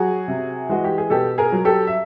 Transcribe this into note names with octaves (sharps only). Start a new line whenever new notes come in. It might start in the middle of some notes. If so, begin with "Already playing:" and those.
Already playing: F#3 F#4 G#4
C3
E3 G#3 F#4
G4
G#4
B2 G4 A4
G#4 A#4
F#3
G4 A4
E5